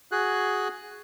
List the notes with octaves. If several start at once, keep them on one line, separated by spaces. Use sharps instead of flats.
F#4 G#4 F#6